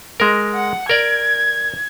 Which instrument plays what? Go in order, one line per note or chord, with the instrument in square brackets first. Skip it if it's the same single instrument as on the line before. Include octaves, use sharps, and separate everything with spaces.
[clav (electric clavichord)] G#3 A#4
[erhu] F#5
[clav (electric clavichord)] A#4 D5 [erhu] G#6